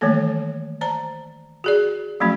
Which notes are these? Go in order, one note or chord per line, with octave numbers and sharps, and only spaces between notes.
D#3 E3 G3 A3 A#3 A4
C5 D5 A5 A#5
F#4 G#4 D5
F3 F#3 A3 C#4 F#4